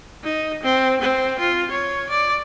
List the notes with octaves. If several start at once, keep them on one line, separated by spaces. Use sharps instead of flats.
D#4
C4
C4
F4
C#5
D5